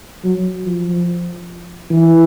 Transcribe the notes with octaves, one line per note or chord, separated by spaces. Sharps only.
F#3
F3
E3